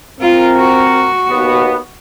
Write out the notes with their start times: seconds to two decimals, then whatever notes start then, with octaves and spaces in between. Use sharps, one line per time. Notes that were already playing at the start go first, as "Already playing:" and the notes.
0.21 C4 F4 A#4
0.57 F#4
1.30 D#2 B2 B3